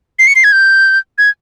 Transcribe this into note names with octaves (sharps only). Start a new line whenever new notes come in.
C7
C#7
C7
G#6
G6
G#6